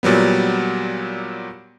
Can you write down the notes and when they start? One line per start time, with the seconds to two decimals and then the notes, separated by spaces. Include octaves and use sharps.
0.03 A#2 F#3 G3 B3